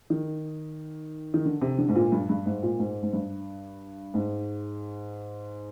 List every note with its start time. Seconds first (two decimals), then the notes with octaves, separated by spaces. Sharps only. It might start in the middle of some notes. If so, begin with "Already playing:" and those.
0.10 D#3
1.34 D#3
1.45 D3
1.62 C3
1.78 D3
1.89 G#2
1.95 A#2
2.12 G2
2.29 G2
2.46 G#2
2.63 A#2
2.79 G#2
3.02 G#2
3.13 G2
4.14 G#2